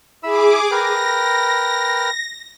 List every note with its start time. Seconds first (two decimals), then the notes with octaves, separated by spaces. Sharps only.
0.23 E4 G#4 B5 D6 E6
0.71 A#4 B4 G5 A#6